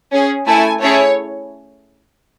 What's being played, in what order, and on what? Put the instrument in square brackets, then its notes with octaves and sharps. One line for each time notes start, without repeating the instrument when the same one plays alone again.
[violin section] C#4 G#4
A3 E4 A4 G#5
A3 C#4 E4 G#4 C#5